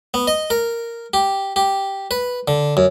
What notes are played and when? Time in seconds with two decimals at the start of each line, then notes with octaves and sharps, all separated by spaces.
0.14 B3
0.27 D#5
0.50 A#4
1.14 G4
1.56 G4
2.11 B4
2.48 D3
2.77 F#2